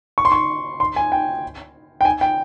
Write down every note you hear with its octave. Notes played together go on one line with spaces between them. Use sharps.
C#6
C6
C#6
C6
G#5
G5
G5
G#5
G5